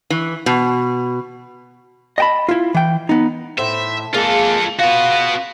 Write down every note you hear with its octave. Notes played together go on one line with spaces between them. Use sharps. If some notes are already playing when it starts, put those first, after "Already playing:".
E3
B2
D#5 F#5 G5 A5 B5
E4 F4
E3 G5
B3 D#4
A2 C5 E5
G#3 A#3 F4 G#4 A4
B3 F4 F#4